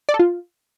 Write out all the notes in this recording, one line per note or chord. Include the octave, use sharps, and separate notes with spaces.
D5
A4
F4